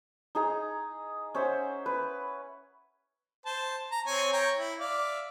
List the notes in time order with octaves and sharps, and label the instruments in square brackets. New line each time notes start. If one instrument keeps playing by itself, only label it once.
[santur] D#4 G#4 A#5
C#4 C5 E5 F#5
B4
[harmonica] C5 A5
A#5
C4 C#5 G#5
C#5 G5 A#5
E4
D5 E5 F5